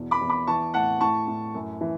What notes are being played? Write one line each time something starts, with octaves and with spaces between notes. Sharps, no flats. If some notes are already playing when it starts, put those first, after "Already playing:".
Already playing: E2 B2
B5 D6
E2
B5 D6
E3 A5 C#6
A2 F#5 A5
A2 A5 C#6
A2
F#2
E3